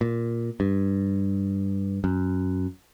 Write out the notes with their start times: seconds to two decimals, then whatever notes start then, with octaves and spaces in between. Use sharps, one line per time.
0.01 A#2
0.60 G2
2.04 F#2